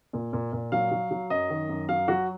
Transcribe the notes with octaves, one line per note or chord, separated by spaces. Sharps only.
A#2
A#2
A#2
F#3 F5
F#3
F#3
F#2 D#5
D#3
F#2
F#3 F5
F#3 F#4